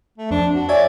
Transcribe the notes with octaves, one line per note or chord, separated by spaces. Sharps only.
A3
F2 D4
F#4
C#5 D5 E5 G#5